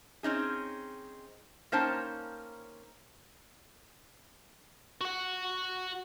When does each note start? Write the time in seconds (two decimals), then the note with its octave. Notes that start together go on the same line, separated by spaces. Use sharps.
0.23 C4 C#4 D#4 G#4
1.72 A#3 C#4 D#4 C5 G5 A5
5.01 F#4 F#5